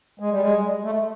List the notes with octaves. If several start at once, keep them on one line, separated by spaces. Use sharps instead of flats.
G#3
G3
G#3
A3